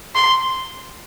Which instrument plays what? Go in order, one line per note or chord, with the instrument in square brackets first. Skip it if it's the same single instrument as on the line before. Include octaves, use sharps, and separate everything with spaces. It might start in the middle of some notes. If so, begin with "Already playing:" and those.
[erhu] C6